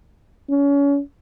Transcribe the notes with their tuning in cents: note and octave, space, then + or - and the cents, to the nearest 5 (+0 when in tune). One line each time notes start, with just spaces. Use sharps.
C#4 +30